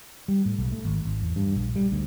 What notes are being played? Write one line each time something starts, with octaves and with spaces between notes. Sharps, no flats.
G3
A2
B1
A3
G#1
G#1
E2
G2
A#1
G3
D2